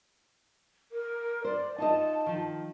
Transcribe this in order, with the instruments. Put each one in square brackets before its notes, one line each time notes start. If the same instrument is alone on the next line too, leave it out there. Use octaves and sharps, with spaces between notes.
[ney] A#4
[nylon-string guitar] C5 [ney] D5
[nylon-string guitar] D#4 F4 D#5 [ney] A5
[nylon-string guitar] D#3 F3